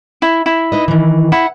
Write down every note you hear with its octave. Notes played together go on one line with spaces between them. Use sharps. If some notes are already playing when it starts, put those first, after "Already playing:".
E4
E4
D#4 B4 D#5
D#3 E3
E4 F#5